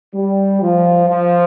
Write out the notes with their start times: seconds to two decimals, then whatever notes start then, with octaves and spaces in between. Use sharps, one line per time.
0.14 G3
0.62 F3
1.08 F3